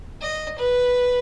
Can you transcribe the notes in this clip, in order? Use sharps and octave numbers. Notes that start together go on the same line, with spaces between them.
D#5
B4